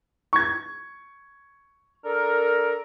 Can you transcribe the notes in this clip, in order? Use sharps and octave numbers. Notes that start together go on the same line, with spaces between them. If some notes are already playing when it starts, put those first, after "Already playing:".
C#6 G#6
D4 A4 A#4